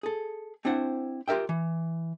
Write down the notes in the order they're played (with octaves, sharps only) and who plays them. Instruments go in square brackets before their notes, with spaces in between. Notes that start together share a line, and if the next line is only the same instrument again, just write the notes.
[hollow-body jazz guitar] G#4 A4
C4 D4 E4 C5 F#5
F4 G4 A#4 E5 G5
E3